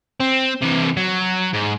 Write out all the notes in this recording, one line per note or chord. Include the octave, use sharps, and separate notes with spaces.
C4
C3 E3
F#3
G#2